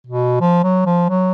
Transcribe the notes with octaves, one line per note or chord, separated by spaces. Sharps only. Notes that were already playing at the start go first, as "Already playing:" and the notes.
B2
F3
F#3
F3
F#3